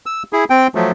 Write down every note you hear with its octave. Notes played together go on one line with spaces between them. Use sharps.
E6
E4 G#4
C4 G5
F3 F#3 A3